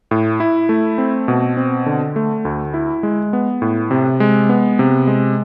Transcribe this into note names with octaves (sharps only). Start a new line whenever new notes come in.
A2
E4
A3
C4
B2
C4
D3
A3
D2
E4
G#3
B3
A2
C3
G#3
B3
C3
G#3